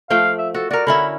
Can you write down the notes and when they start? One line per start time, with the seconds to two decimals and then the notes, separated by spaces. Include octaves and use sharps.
0.10 F3 A3 F5 G5
0.38 E5
0.54 F#4 A4
0.71 F#4 A#4 D5
0.87 D3 C#4 E4 B5